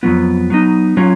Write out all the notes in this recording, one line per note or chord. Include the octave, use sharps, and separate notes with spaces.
F2 C#3 F#3 B3 F4
F#3 B3 D#4
F#3 C#4 F4